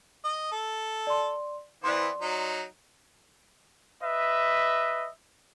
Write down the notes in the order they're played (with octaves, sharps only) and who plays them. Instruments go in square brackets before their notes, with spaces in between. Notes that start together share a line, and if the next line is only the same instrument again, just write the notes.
[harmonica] D#5
A4
[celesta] D5 C6
[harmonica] E3 B3 C4 [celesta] D5 C6
[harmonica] F#3 D#4
[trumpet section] B4 D#5 E5